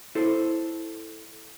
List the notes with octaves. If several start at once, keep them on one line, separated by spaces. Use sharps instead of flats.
E4 A4 C5